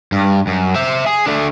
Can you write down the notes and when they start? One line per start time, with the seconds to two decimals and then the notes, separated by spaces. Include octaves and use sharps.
0.12 G2
0.47 F#2
0.76 C5 E5
1.07 G#4
1.26 A3 D4